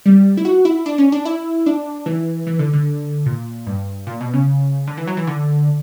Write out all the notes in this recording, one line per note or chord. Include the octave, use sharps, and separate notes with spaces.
G3
E4
F#4
E4
D4
C#4
D4
E4
D4
E3
E3
D3
D3
A#2
G2
A#2
B2
C#3
D3
E3
F#3
E3
D3